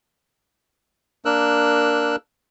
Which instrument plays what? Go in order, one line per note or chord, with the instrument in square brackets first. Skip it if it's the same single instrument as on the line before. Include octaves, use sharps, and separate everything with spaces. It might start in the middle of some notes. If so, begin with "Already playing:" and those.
[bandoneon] A#3 D4 A#4 E6 F#6